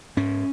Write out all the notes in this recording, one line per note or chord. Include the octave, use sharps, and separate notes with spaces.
G#2 C#4